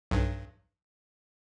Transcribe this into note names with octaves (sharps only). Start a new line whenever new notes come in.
B1 G2